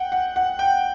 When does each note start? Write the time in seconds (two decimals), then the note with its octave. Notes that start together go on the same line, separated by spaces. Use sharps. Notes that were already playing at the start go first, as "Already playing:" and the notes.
Already playing: F#5 G5
0.12 F#5
0.36 F#5
0.59 G5